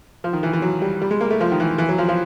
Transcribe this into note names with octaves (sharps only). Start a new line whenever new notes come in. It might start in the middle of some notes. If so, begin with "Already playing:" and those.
F3
D#3
E3
E3
F#3
G3
G3
G#3
A#3
A3
F3
D#3
E3
E3
F#3
F3
F3